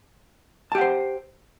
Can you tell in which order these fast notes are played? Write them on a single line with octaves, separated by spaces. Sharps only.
A5 G4 F#5 C5